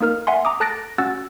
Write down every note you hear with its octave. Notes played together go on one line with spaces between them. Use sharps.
A#3 D#4 A#4 F6
E5 F#5 G#5 C6
A#5 D6 D#6
A4 A5 F#6 A6 A#6 D7
C#4 F#4 F#5 E6 F#6 A6